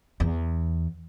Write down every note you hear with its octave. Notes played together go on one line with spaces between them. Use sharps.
E2